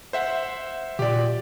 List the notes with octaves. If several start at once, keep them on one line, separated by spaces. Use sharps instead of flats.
C5 E5 F#5
A#2 G4 D5